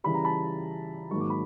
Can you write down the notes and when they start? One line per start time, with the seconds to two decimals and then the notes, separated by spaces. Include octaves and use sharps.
0.04 C#3 E3 G3 B5
0.14 A#5
0.24 A5 B5
1.11 G#2 D#3 F#3 A#3 C#6
1.20 D6
1.30 B5